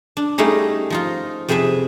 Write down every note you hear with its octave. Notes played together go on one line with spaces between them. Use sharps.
D4
G3 A3 C#4 D#4 G#4
F3 D#4 F4
F2 C3 G#4 B4 E5 A5